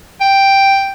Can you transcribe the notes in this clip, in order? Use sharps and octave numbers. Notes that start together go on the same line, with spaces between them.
G5